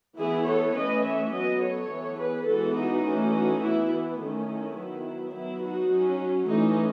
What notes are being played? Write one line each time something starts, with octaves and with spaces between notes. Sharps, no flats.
E3 B3 E4 G#4
A4 C#5
E3 A3 C#4 B4 D#5
C#5 E5
F#3 B3 B4 D#5
A4 C#5
E3 B3
G#4 B4
E3 G#3 B3 F#4 A4
D#4 F#4
E3 A3 C#4
D#4 F#4
E3 B3 E4
D#3 A3 C#4
E4
D#3 F#3 B3
F#3 B3 E4
D#4 F#4
F#3 C#4
E3 A3 C#4 D#4